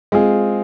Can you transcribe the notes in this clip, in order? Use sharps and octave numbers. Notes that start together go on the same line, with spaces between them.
G#3 C4 F4 G#4